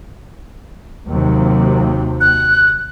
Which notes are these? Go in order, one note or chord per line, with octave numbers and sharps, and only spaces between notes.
D#2 C3 F#3
F#6